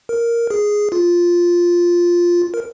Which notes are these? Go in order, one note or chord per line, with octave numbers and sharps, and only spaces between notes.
A#4
G#4
F4
A#4